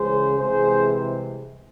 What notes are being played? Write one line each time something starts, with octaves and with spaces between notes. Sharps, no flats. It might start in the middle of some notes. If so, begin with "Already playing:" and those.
Already playing: C#2 C#3 E3 G#4 C5
C2 C3 E3 G#3 G#4 C5